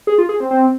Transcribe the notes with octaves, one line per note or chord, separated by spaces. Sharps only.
G#4
F4
G#4
C4
C4